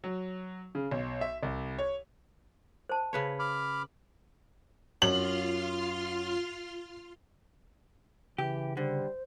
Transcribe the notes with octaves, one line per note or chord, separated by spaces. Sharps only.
F#3
C#3
B1
E5
C2
C#5
C5 A5
C#3 B4 C#5
B5 D6 F6
F#2 F4 C6 F6 F#7
C#3 E3 G4 G5
D3 G3 C5